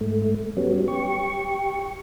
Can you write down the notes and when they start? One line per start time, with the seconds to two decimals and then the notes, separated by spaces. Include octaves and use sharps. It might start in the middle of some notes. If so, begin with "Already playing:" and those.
0.01 G#2 A3
0.57 F#3 G3 B3 C#4
0.88 G4 C#6